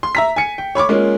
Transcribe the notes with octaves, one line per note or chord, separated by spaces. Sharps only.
C6
E5 A#5 B6
G#5 C#7
G5
C#5 B5 C#6 D6
G#3 A#3 C#4 F4